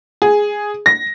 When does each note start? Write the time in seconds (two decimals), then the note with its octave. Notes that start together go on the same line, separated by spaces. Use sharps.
0.22 G#4
0.86 A#6